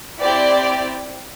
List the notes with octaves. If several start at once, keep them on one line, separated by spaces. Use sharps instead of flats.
C4 E4 G4 D5